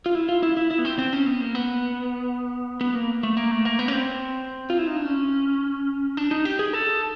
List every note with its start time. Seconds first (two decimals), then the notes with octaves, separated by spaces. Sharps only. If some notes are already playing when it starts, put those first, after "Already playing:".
0.06 F4
0.15 E4
0.29 F4
0.43 E4
0.57 E4
0.71 E4
0.79 B3
0.85 C4
0.99 C4
1.13 C#4
1.27 B3
1.41 A#3
1.55 B3
2.81 B3
2.95 A#3
3.23 A3
3.37 A#3
3.51 A3
3.65 A#3
3.79 B3
3.88 C#4
3.93 C4
4.70 F4
4.79 E4
4.87 D#4
4.96 D4
5.05 C#4
6.17 D4
6.31 D#4
6.45 G4
6.59 G#4
6.73 A4